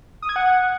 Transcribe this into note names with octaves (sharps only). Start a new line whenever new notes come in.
D#6
G#6
F#5